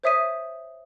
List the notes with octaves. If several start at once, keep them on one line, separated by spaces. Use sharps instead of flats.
C5 C#5 E5 D#6 B6 D#7